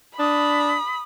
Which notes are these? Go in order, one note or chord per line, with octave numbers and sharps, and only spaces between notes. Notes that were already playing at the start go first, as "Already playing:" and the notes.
D4 B5 D#6